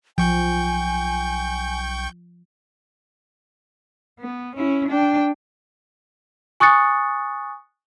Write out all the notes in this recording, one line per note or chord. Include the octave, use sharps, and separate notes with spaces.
B1 F3 G5 G#5 C#6 G6
B3
C#4 E4
D4 G5
G#5 C#6 D#6 F#6 A6 C#7